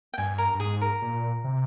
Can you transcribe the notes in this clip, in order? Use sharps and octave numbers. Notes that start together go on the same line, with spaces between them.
G5
G2 G#5
A#4
G2
G#2 G#4
A#4
A#2
C3